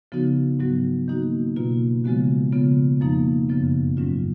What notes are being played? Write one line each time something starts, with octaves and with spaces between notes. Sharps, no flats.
C#3 F3 B3 D#4 F#4
G#2 F#3 B3 F#4
D#3 A#3 D#4 F#4
B2 A#3 F4
C#3 F3 G#3 B3 F#4
C#3 F3 B3 F4
F2 F3 A#3 D#4
F#2 C#3 F3 B3
G#2 F#3 C#4 F4